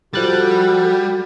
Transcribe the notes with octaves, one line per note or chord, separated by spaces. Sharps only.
F3 G3 F#4 A4 F#6 A6